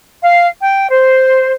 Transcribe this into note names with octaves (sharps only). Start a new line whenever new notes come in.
F5
G5
C5